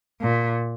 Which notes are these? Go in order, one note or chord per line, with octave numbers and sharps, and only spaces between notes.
A#2